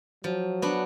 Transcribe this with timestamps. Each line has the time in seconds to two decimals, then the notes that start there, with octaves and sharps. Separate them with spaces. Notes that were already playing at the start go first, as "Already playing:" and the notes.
0.24 F3 F#3
0.62 B3 D4 F#4